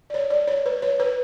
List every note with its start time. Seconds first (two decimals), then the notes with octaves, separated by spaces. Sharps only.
0.10 D5
0.14 C#5
0.30 D5
0.48 C#5
0.66 B4
0.82 C#5
1.00 B4